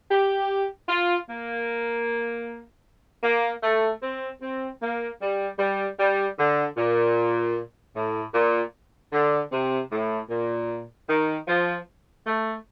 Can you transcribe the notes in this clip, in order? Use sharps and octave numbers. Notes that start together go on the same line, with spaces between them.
G4
F4
A#3
A#3
A3
C4
C4
A#3
G3
G3
G3
D3
A#2
A2
A#2
D3
C3
A2
A#2
D#3
F3
A3